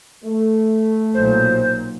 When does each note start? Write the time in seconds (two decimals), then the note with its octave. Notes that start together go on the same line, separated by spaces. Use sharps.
0.25 A3
1.14 B1 A#2 C5